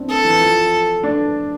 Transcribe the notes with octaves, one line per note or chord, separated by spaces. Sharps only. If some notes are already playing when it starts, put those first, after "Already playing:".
Already playing: C4 D4 E4
A#3 A4
E3
F3
D4